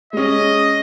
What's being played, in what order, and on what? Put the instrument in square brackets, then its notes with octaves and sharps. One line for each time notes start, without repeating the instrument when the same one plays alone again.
[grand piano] G#3 C#4 [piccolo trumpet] D#5